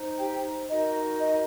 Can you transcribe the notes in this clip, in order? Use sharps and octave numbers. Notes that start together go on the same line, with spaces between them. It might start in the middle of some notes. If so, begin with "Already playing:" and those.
Already playing: D#4 C5
G4 G5
D#4 F#4 A#4 D#5
D#5